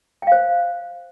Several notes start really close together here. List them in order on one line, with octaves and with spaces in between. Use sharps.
G5 F5 C5